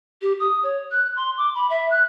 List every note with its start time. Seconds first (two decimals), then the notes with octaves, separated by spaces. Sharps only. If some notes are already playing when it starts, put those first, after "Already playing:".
0.22 G4
0.40 D#6
0.63 C#5
0.91 F#6
1.16 C6
1.38 D6
1.55 B5
1.70 E5
1.91 F#6